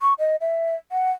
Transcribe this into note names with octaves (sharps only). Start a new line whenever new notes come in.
C#6
D#5
E5
F#5